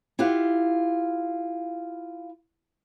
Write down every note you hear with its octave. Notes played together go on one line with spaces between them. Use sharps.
E4 F4 G4 F5 F#5